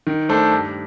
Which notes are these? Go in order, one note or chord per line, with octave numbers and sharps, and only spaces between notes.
D#3
A3 D4 A4 C5
G2